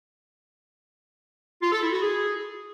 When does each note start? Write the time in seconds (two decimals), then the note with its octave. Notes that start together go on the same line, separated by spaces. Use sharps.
1.62 F4
1.72 A4
1.82 E4
1.92 F#4
2.02 G#4